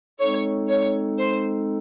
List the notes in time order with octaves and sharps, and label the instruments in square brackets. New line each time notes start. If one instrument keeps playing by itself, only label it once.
[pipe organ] G#3 C4 D#4 A4 [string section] C#5
[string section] C#5
C5